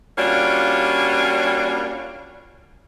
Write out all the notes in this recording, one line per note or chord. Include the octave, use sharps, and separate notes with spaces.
G3 A#3 C#4 D4 F4 F#4